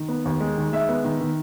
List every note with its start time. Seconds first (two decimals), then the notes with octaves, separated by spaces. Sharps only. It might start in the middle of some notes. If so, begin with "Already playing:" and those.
Already playing: D#3
0.09 B3
0.25 D#2
0.40 G#3
0.57 D#3
0.72 G#3 E5
0.89 B3
1.04 D#3
1.20 D#3